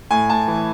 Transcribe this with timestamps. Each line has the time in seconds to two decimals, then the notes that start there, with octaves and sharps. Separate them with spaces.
0.11 A2 G#5
0.30 A2 A5
0.48 E3